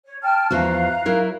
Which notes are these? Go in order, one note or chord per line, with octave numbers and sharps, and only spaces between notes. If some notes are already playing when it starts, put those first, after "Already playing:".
C#5
G5 A5 F6
E2 F3 F#4 F5 A#5 F#6
F#3 E4 A#4